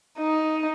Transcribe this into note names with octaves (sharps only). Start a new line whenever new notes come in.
D#4